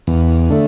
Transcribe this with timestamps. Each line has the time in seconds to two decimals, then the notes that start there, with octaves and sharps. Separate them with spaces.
0.07 E2
0.50 D3 A3